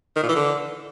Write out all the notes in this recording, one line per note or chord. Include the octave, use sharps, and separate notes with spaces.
D#3
A#2
E3
D3